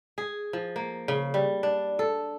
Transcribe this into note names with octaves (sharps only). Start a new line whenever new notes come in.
G#4
F3
A#3
C#3
G3
D4
A4